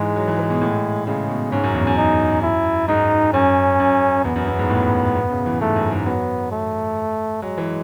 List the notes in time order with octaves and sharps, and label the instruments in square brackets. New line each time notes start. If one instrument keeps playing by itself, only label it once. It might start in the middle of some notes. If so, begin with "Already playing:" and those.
Already playing: [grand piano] G#2 E3 [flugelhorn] G#3
[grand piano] F#3
E3
E3
B2
A2
[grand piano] C#3 [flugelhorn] G#3
[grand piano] B2
[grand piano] G#2 [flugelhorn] C#4
[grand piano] F#2
E2
F#2
[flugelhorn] D#4
E4
[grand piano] G#2 [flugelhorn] D#4
[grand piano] F#2 [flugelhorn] C#4
[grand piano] F#2
[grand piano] E2 [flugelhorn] B3
[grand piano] F#2
F#2
G#2
A2
B2
C#3
E3
[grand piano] G#2 [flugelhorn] A3
[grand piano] F#2
G#2
[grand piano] F#3 [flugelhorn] B3
[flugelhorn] A3
[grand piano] F#3 [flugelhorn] G#3
[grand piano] E3